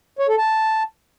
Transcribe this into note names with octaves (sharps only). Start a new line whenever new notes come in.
C#5
A4
A5